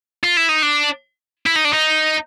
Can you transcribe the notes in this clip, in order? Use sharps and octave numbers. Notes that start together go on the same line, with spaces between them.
F4
E4
D#4
D4
E4
D#4
D4
D#4